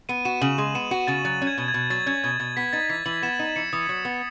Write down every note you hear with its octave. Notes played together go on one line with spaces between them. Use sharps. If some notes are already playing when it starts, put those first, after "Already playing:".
B3 D#7
F#4 E7
C#3 F#7
G#3
B3 E7
F#4
C#3 A6
F#3 A6
C#4
G#6
B2
G#6
B2
F#3 A6
C#4 G#6
B2 G#6
B2 A6
B3 B6
D#4 A6
E3 B6
E3 F#7
B3 E7
D#4
E3 C#7
E3 D#6
F#3
B3